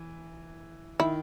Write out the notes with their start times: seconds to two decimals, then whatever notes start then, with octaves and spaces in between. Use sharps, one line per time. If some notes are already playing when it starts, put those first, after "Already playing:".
Already playing: E3
0.99 D#3 E4